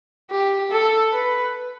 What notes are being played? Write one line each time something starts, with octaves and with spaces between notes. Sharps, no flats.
G4
A4
B4